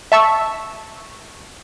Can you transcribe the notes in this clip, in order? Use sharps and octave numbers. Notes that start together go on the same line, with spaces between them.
E5 A5 C#6 E6